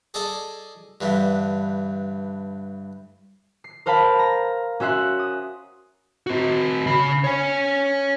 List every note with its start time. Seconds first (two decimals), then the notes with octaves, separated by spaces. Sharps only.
0.14 G#4 A4 D5 D#5 G#5 A5
1.01 G2 D3 E3 G3
3.64 C7
3.86 A#4 C5 F5 A5 B5
4.19 A#5
4.80 C#4 F#4 E5 C6 F#6
5.19 D#6
6.27 C4 F#4
6.86 C#3 B5
7.24 C#5 G#5